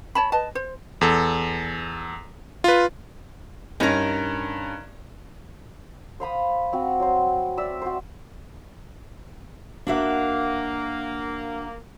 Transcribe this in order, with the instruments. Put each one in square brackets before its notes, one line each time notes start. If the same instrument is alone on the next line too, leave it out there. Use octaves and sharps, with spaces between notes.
[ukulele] C#5 A5 B5
B4 D#5 A5
C5
[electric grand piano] E2 A4
F4 B4
[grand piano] G2 C#4 [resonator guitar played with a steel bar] D#4 A#4
[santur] C5 F5 B5 D#6
C4 F#4
F#3 C5
D5 E5 E6
F#4 C5
[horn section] A#3 [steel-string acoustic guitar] D4 F#4 E5